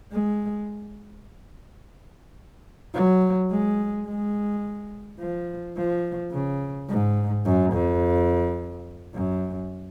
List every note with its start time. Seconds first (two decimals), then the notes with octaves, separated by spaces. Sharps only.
0.12 G#3
2.94 F#3
3.51 G#3
4.07 G#3
5.19 F3
5.77 F3
6.32 C#3
6.89 G#2
7.45 F#2
7.73 F2
9.14 F#2